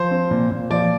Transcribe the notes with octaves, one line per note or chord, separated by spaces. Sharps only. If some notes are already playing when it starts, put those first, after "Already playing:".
Already playing: F3 C5
C4
A#2
A#2
F3 D5